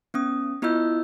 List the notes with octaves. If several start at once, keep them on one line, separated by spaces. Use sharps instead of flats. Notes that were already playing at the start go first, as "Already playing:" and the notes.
B3 C#4 D#6
B3 E4 F4 D#5 E6 G6